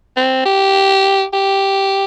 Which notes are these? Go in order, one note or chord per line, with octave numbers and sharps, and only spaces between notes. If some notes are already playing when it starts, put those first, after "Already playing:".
C4
G4
G4